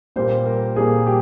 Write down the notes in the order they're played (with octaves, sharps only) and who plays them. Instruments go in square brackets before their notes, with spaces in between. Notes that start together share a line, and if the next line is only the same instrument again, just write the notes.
[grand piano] A#2 G3 A#3 C5
A#4
A#2 G3 A#3 G#4
G4